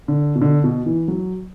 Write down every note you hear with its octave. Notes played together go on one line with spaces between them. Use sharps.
D3
B2
D3
B2
E3
F#3